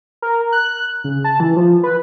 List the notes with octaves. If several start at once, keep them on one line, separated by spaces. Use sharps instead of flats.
A#4
F#6
C#3
A5
E3
F3
B4